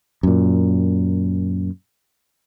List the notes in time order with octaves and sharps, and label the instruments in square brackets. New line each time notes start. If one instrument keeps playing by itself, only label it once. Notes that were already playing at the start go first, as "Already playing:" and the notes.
[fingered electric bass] F#2 A#2